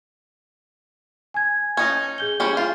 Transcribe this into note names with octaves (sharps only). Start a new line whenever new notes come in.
G#5 G#6
C#4 D#4 G#6
G#4 G6 G7
G3 C#4
F4